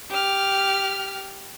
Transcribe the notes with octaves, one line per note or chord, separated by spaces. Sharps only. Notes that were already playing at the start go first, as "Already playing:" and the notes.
G4 F6